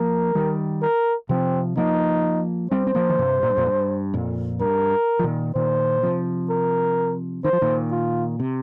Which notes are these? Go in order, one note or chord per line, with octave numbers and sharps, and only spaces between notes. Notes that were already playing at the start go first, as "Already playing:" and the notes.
Already playing: F3 A#3 A#4
D#3 G3
A#4
C3 F3 C4
F3 A#3 D#4
G3 C4 C5
C4
F3 A#3
D#3
G2 C3
A#2
G2
F2 A#2
G2
F2 A#2
G2 A#4
F3
A#2 D#3
A#2 D#3 C5
C3 F3
A#4
D#3 C5
F3
A#2 D#3
F4
C3